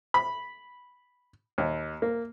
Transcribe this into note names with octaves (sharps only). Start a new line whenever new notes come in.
B5
D#2
A#3